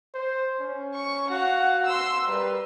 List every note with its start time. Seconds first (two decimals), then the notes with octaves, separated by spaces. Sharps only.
0.14 C5
0.60 C#4
0.94 C#6
1.30 F#4 F5 F#5
1.86 C6 E6
2.27 G3 A#4 B4